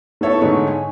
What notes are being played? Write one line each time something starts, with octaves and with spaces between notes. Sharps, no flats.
A3 B3 E4 A4 C#5 E5
G#2 D3 A3 D#4 C#5
G#5